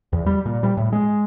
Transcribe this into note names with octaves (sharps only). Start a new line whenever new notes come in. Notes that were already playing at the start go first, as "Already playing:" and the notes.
E2
G3
A#2
G3
A2
G#3